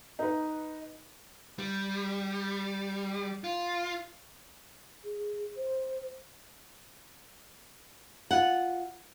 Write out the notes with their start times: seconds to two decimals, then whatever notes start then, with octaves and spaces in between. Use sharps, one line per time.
0.19 D#4 B4
1.59 G3
3.44 F4
5.04 G#4
5.57 C5
8.31 F4 F#5